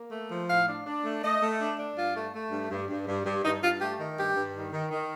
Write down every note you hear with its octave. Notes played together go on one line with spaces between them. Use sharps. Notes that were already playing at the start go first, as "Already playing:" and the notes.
Already playing: A#3
A3
F3
A2 F5
D4
D4
A3
A3 D#5
A3
D4
D4
G2 F4
A3
A3
G2
G2
G2
G2
G2
G2 D#4
G2 F4
A3 G4
D#3
G2 G4
G2
D#3
D#3
D#3